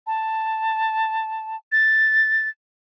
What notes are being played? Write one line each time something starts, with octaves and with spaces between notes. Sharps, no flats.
A5
A6